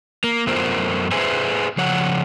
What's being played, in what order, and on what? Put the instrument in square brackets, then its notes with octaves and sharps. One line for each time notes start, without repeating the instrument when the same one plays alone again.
[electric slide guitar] A#3
F#2 A3 B3 F4 A#4 C5
G#4 B4 C5 E5 G#5
C#3 F3 C#5 F#5